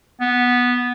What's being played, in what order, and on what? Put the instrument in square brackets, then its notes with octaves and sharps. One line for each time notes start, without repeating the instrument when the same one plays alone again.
[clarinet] B3